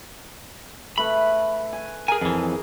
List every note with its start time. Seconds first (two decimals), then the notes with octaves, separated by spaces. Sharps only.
0.98 A3 B4 B5
1.73 G#5
2.08 G#4 A#4 G#5 A#5
2.21 F2 E3 G#4